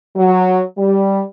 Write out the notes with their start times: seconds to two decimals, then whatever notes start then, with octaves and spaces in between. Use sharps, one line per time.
0.16 F#3
0.78 G3